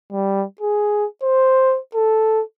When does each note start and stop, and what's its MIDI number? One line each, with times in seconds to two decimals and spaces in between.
0.12 0.45 55
0.61 1.05 68
1.23 1.79 72
1.94 2.42 69